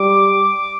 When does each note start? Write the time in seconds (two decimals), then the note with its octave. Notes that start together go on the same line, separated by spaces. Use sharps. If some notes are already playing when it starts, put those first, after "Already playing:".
Already playing: G3 D6